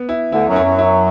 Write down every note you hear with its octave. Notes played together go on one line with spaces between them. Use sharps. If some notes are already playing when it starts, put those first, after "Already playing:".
Already playing: B3
E4
D2 D3 E4
F#2 F#3
E4
F#2 F#3
E4